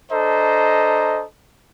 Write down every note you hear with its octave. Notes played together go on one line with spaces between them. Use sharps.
D4 A4 C5 D#5 A#5